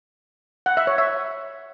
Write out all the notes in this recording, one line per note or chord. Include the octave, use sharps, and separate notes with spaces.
F#5
E5
C#5
E5